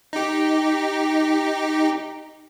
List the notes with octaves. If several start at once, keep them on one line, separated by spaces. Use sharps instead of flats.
D#4 G4